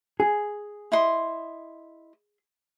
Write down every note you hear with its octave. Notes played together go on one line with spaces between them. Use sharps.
G#4
E4 D#5 C6